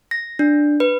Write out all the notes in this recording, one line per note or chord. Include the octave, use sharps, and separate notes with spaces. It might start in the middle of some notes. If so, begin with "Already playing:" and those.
A#6
D4
B4